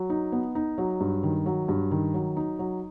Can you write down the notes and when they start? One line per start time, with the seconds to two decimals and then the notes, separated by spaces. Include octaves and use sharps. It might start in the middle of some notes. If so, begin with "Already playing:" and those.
Already playing: F#3
0.10 D#4
0.32 B3
0.55 D#4
0.78 F#3
1.00 G2
1.23 D#3
1.46 F#3
1.69 G2
1.91 D#3
2.14 F#3
2.37 D#4
2.59 F#3